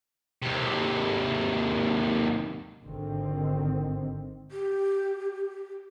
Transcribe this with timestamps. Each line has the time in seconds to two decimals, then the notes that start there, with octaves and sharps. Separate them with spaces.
0.42 D#2 C3
2.83 G#1 D3 D#3 C4
4.50 G4